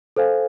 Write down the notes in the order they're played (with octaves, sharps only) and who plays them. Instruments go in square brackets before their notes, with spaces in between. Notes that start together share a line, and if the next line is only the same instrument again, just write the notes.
[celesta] A4 C5 F5 G#5